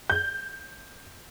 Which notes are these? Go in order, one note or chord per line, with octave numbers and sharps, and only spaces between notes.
G6